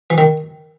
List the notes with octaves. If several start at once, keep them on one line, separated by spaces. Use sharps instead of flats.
E3
D#3